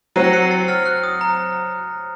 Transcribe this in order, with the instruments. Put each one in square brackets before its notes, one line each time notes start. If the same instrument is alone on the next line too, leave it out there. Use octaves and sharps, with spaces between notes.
[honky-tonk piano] F#3 C4 F#4 [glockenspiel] C7 D#7
[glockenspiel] A#6 C#7
C7 D#7
A#6 C#7
A6 C7
F6 A6
F#6
D#6
A#5